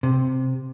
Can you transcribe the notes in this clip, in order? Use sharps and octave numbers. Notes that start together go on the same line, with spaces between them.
C3